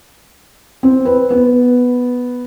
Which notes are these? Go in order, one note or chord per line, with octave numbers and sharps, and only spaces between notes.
C4
B4
B3